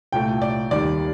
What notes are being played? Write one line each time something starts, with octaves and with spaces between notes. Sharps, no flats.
C2 A#2 A3 G5
D5
D#2 D#3 G3 D5